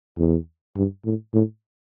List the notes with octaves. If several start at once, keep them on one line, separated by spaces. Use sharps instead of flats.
E2
G2
A2
A2